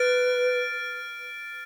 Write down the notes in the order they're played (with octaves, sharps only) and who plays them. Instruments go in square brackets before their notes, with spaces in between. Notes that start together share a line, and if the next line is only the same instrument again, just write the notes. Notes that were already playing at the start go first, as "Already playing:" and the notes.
Already playing: [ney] B4 [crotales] F6 A6 D7